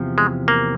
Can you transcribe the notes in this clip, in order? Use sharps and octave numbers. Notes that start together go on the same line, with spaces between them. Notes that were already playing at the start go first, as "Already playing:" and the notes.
Already playing: E2 C3 F3
G#3
A#3